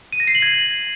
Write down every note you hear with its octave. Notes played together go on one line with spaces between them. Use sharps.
D#7
A#6
C7
F#7
G#6